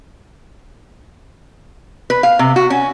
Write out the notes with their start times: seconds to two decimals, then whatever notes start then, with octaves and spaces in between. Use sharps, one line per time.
2.10 B4
2.23 F5
2.39 C3
2.56 F#4
2.70 C#4